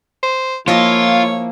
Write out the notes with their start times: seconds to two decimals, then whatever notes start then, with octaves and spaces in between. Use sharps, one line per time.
0.23 C5
0.68 F3 A#3 E4 F4 C#5 D#5